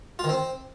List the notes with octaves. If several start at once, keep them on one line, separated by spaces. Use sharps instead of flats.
F4
D#3
C4